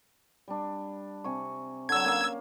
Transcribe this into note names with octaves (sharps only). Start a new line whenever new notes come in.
G3 D4
C3 G#5 C#6
D3 F#3 E6 G#6
A#3 C#4 F5